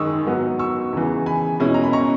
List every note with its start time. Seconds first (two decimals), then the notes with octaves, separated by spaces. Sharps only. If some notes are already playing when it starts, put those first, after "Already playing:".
Already playing: F#2 D#3 G#3 C#6 D#6 E6
0.26 G#2 F#3 B3
0.59 C#6 E6
0.93 E2 C#3 E3
1.26 G#5 B5
1.60 B2 G#3 C#4 E4
1.74 A#5
1.84 B5
1.93 A#5 C#6